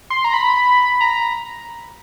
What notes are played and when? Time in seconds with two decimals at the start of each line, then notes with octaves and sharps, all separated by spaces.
0.10 C6
0.24 A#5
0.34 B5
1.00 A#5